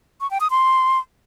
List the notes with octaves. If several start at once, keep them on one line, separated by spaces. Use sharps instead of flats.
C#6
G5
D#6
C6